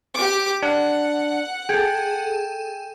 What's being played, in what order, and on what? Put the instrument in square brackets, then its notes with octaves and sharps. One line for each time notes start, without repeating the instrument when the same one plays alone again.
[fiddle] G4 D6
[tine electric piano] D4 [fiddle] F#5
[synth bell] G#4 A4 [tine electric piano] G5